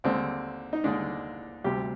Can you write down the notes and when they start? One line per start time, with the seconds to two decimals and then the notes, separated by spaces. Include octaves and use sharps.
0.04 D#2 D3 G#3 C4
0.73 D#4
0.84 D#2 D3 G#3 D4
1.64 D2 C3 G3 G4